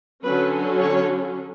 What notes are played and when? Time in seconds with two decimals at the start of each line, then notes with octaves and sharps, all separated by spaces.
0.23 D3 F#3 C#4 B4
0.81 C#5